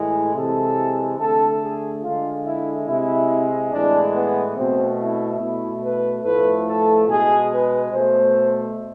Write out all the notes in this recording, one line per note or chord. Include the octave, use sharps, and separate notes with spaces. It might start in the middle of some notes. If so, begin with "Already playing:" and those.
Already playing: A2 E3 G#3
C3 E3 G#3 A4
D3 A3 A4
G#4
D3 G#3 F4
E4
C3 G#3 E4
A2 E3 G#3 D4
B3
B2 A3 C4
E4
B2 A3 E4
B4
A2 F3 A3 B4
A4
B2 G#3 G#4
B4
B2 A3 C5